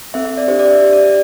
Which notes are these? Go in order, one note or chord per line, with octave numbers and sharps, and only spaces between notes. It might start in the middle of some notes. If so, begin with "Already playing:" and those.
C4 A4 E5
E5
D5
D4 G4 C5
D5
E5
D4 G4
D5
D5